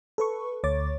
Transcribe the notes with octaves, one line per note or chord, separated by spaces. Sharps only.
A4 B4 C#6
D2 C#5 D6 A6